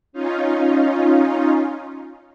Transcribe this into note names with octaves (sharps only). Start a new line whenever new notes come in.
C#4 D#4 F4